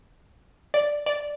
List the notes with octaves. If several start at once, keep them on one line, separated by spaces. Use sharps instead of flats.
D5
D5